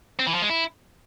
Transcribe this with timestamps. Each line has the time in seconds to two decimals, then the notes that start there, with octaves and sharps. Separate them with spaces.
0.19 C4
0.27 E3
0.34 F3
0.42 G#3
0.50 E4